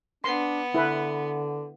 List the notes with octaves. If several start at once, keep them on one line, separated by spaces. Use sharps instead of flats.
B3 D4 C6
D3 E4 B4